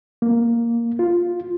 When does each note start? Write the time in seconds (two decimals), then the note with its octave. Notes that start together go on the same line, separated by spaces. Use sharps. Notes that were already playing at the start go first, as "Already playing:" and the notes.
0.22 A#3
0.99 F4